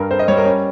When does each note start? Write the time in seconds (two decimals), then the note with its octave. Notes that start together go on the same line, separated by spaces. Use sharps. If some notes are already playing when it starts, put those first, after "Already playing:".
Already playing: G2 G3 A#4
0.11 C4 C5
0.19 D#5
0.28 G3 C#5
0.37 A#4
0.45 C#4